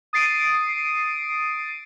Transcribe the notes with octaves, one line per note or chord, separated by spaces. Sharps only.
D#6 A6 C7 D7 D#7